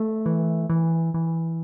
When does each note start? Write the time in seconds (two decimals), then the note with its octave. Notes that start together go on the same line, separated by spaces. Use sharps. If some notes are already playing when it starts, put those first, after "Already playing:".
Already playing: A3
0.26 E3
0.70 E3
1.14 E3